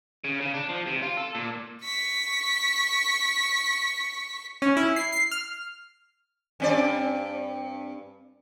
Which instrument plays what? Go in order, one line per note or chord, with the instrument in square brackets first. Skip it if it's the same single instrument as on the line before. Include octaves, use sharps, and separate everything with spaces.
[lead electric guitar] C#3
C#3
D4
F3
C3
F4
A4
A#2
[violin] C#6 B6
[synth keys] C#4
E4
C7
C7
F6
[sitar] G2 C4 D5